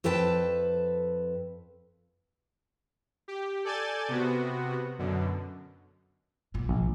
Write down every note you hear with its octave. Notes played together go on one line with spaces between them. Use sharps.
F2 A4 B4 G5 A5
G4
A4 D5 G#5 G6 A6
C3 B3 F#4
F#2 B2 D3
B1 A#2
A#1